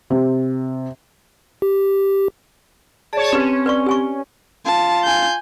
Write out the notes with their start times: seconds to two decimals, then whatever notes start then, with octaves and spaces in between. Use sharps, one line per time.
0.10 C3
1.62 G4
3.13 G#4 C#5 D5 A5
3.32 C4 C#4 G4 B4
3.66 B4 D5 C#6
3.86 G4 G#5 C#6
4.66 F4 A5
5.04 G#5 G6